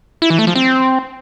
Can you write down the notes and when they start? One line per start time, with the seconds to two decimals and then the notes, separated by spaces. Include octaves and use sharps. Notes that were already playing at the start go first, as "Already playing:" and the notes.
0.22 E4
0.30 E3
0.39 A3
0.47 F3
0.56 C4